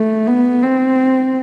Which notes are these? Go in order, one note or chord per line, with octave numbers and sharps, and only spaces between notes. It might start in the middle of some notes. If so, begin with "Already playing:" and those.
Already playing: A3
B3
C4